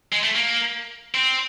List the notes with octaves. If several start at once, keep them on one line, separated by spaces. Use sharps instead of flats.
G#3
A3
A#3
C4